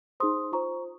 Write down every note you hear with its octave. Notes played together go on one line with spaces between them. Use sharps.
D#4 G#4 C5 C6 D#6
F4 C5 A#5 C#6